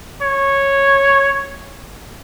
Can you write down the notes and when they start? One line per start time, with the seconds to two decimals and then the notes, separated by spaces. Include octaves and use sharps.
0.23 C#5